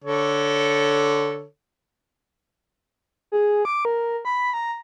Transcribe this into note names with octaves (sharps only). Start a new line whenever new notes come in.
D3 A4 C#5
G#4
D6
A#4
B5
A#5